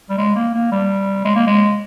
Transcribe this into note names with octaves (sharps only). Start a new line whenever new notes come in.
G3
G#3
A#3
A#3
G3
G#3
A#3
G#3